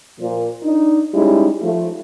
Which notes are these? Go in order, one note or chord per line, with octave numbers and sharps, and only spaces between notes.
A#2 F3
D4 D#4
G3 G#3 C#4 D#4 E4
F3 A3